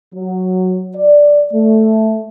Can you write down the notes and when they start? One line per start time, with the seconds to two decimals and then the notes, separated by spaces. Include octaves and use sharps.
0.14 F#3
0.96 D5
1.53 A3